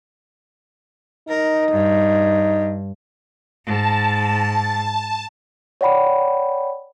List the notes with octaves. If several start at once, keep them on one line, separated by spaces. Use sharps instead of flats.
D#4 A#4
G2
G#2 A5
C#5 D5 F#5 G5 B5